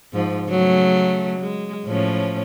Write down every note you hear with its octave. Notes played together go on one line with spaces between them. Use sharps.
G#2 F3
C#3 F#3 A3
G#3
A2 F3 C#4